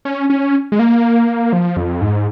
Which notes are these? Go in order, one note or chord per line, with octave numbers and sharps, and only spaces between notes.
C#4
C#4
G#3
A#3
F3
F2
G#2